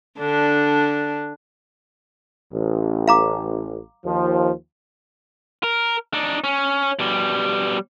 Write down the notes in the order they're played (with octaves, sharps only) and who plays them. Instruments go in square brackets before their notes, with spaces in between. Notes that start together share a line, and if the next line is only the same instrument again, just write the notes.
[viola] D3 D4
[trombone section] A1
[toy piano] F5 A#5 D6
[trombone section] D#2 F3
[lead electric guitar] A#4
D4 D#4
C#4
B2 G3